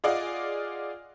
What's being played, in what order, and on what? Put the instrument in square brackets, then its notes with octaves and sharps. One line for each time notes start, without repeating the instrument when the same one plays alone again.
[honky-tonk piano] F4 G#4 D5 D#5 F5 F#5